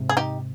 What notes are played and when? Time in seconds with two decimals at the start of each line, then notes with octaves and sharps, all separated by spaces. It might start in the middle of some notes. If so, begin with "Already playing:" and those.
Already playing: G#2 C3
0.09 G#4
0.17 D#4 G4